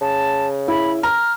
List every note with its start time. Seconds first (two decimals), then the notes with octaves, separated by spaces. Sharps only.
0.01 C#3 A5
0.68 E4 B5
1.03 A#5 F6